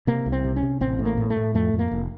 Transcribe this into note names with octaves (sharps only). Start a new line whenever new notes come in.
C3 A#3
C2
C4
C3
C#4
C3
A1 C4
A2
A#3
A2
A3
A2
F2 A3
F2
A#3
F1